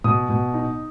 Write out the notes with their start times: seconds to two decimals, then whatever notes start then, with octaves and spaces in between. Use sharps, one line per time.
0.04 B2 D#6
0.29 B2
0.54 D#4